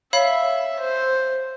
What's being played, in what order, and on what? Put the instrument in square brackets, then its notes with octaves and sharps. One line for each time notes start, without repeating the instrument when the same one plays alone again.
[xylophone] C#5 F5 B5 [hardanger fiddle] E5
[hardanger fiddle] C5